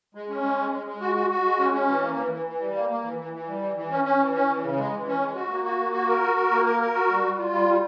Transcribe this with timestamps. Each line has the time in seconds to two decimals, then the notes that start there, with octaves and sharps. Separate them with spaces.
0.15 G#3
0.29 C#4
0.43 G#3
0.58 G#3
0.72 G#3
0.87 G#3
1.01 F#4
1.15 F#4
1.30 F#4
1.45 G#3
1.59 C#4
1.74 C#4
1.88 E3
2.02 A#3
2.17 E3
2.32 E3
2.46 E3
2.61 G3
2.76 A#3
2.89 A#3
3.04 E3
3.18 E3
3.33 E3
3.48 G3
3.62 E3
3.76 E3
3.91 C#4
4.05 C#4
4.19 E3
4.35 C#4
4.49 E3
4.63 C#3
4.78 G#3
4.92 E3
5.07 C#4
5.21 G#3
5.35 F#4
5.50 A#3
5.64 F#4
5.79 A#3
5.93 F#4
6.08 A#4
6.22 F#4
6.37 A#4
6.51 A#3
6.65 A#4
6.81 A#4
6.94 F#4
7.09 G3
7.24 G3
7.38 F4
7.52 G3
7.67 G3